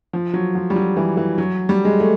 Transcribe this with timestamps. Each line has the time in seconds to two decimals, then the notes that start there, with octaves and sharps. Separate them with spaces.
0.13 F3
0.34 F#3
0.55 F3
0.70 G3
0.76 F#3
0.97 E3
1.17 E3
1.38 F#3
1.69 G3
1.85 G#3
2.00 A3